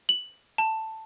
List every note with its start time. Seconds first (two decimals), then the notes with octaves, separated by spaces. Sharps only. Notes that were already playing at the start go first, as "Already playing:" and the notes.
0.09 F#7
0.58 A5